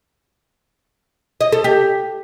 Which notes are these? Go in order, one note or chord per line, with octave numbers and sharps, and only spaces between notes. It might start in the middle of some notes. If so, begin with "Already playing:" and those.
D#5
A4
G4